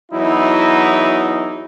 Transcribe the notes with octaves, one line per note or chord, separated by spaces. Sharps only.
E2 F#3 D#4 E4